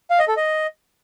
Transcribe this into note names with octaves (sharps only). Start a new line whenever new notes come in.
F5
D#5
A4
D#5